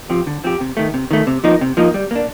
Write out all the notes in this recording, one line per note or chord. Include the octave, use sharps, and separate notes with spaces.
F3 C4 G4
D3
F3 C4 G4
C3
D#3 A3
C3
D#3 A3
C3
F3 A#3 D#4
C3
F3 A#3 D#4
G3
A#3 D4